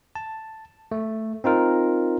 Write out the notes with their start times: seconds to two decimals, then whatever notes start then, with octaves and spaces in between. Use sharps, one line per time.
0.15 A5
0.92 A3
1.44 C4 D#4 F4 A#4